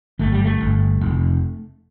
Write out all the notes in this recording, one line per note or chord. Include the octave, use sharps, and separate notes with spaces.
G1 A3
G3
A3
G1
F1